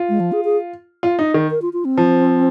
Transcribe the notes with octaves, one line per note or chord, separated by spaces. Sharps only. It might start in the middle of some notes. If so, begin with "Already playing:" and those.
Already playing: F4
G#3
F3
G#4
G#4
F4
D#4
D#3
A#4
F4
F4
C4
F3